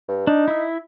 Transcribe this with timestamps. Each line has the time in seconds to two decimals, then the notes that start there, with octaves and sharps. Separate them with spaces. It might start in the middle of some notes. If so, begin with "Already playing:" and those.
0.08 G2
0.27 D4 D#4
0.48 E4 E5